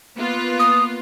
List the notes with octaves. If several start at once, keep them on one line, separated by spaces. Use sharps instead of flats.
A#3 B3 F4
D#6